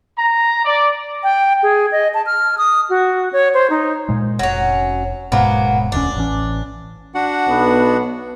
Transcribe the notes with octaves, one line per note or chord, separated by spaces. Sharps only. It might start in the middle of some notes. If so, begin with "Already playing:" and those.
A#5
D5
G5
G#4
D#5
A5
F6
D#6
F#4
C#5
C5
D#4
A#2 G#3
F1 F#3 C#4
D1 G#2 B2 F#3 A#3 B3
E1 D2 C#4 D4
A1 E3 C#4
D4 F#4 F#5
B1 B3